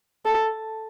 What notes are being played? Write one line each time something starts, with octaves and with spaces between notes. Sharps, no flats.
A4